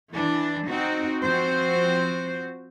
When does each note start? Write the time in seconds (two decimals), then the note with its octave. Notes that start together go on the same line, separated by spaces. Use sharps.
0.12 E3 D4
0.68 C4 D#4 F#4
1.25 F3 C4 F#4 C5